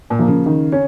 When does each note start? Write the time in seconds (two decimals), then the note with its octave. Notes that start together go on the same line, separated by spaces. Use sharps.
0.10 A#2
0.19 F3 A#3
0.28 C#3
0.46 D#3
0.72 C#4